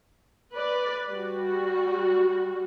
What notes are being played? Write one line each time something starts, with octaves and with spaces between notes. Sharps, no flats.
B4 D5
G3 F#4